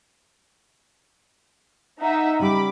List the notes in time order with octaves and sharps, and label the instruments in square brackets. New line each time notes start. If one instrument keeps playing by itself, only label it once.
[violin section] D#4 E5 F#5
[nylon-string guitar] C#3 G3 [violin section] B5 D6